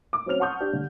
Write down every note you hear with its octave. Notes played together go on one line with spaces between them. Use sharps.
D6
F#3 C4 C#4 F6 F7
F#5 A5 C6 C#6 D#6 G6
D4 G4
G2 D3